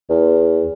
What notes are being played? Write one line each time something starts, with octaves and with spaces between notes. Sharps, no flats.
E2